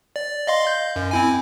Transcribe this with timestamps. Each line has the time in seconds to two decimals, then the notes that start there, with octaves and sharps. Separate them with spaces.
0.16 D5
0.47 D#5 F5 C6
0.67 G6
0.96 F#2
1.11 C4 E4 G#5